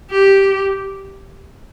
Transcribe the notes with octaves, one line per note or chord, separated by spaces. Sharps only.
G4